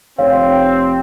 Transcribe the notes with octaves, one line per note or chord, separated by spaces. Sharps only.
F1 C4 C#5 F5